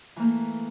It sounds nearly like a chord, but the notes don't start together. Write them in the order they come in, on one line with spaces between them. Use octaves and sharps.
E3 A#3 A3